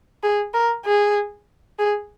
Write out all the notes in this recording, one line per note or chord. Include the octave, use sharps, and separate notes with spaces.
G#4
A#4
G#4
G#4